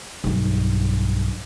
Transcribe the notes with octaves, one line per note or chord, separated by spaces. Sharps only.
B1 G2